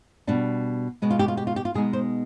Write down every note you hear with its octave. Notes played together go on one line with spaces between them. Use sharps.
B2 G3 D4
B2 G#3 B3
F4
G4
F4
G4
F4
G4
F4
B2 G#3 B3 D#4 G#4
C5